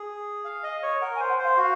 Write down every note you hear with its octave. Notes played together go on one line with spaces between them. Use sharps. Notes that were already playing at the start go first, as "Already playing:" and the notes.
Already playing: G#4
F5
D#5
C#5
A#4 F#5
G#5
C5
F#5
C5
F5
F#4 F5